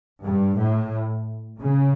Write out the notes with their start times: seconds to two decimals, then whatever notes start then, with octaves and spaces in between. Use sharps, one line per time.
0.23 G2
0.58 A2
1.62 C#3